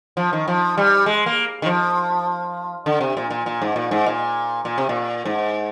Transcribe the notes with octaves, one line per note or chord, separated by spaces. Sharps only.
F3
D#3
F3
G3
G#3
A#3
D#3
F3
D3
C3
A#2
A#2
A#2
G#2
A#2
G#2
A#2
A#2
C3
A#2
G#2